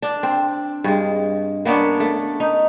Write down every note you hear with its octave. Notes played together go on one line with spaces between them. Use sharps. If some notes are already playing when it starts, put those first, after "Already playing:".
D4
C4
G2 G#3
A#3 B3 C#4 D4
A3
D#4